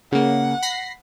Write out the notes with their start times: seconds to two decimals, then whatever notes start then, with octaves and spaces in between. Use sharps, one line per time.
0.12 C#3 A#3 F#5
0.63 B5 A#6 C7